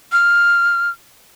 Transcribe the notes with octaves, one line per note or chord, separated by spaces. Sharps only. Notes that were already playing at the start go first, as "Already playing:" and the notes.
F6